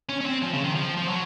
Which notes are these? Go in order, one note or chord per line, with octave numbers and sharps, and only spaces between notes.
C#4
C#4
C4
F3
C#3
D#3
F3
F3
F#3